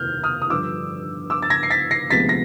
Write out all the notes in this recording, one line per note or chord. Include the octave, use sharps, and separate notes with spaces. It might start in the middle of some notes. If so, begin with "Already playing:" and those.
Already playing: F1 D#2 D#3 F6 G6
D#6 F6
D#6
G2 D3 F3 D6 E6
D6 E6
A6
G#6 A#6
C7
A6 B6
A#6 C7
D2 C3 F3 G#3 B3 A6 B6
A#6